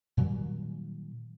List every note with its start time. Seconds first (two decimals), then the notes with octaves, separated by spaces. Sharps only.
0.17 A#2 D#3 F#3 G3